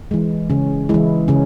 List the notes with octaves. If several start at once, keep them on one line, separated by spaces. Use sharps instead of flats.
E3 G#3
C#3 C#4
E3 G#3 E4
C#3 C#4